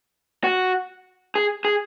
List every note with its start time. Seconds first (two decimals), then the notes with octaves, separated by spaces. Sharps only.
0.44 F#4
1.35 G#4
1.65 G#4